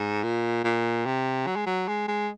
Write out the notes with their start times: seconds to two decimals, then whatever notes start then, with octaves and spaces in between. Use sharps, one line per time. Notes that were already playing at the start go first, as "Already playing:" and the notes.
Already playing: G#2
0.23 A#2
0.64 A#2
1.06 C3
1.47 F#3
1.56 G#3
1.66 F#3
1.88 G#3
2.08 G#3